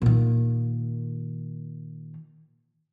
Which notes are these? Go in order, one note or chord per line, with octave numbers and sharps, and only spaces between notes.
A#2 D#3